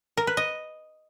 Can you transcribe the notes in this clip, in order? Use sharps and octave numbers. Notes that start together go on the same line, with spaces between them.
A#4
B4
D#5